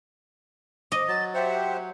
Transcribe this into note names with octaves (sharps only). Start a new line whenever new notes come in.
D#5 D6
F#3 A6
G4 C5 E5 F#5